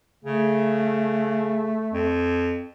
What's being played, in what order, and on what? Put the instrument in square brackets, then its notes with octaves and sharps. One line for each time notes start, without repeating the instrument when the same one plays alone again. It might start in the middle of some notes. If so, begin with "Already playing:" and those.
[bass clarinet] C#3 [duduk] A3
[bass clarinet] F2